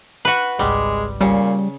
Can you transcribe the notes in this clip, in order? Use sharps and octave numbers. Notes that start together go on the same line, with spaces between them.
F#4 B4
G#1 C#2 G3 G#3
A#2 C#3 G3